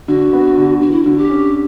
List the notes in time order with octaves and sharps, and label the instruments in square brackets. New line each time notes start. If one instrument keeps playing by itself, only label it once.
[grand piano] D3 [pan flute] F#4
[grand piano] B3
D3
[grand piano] D3 [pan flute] F#4
[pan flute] E4
[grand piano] D3 [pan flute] F#4
[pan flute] G4
[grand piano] C#4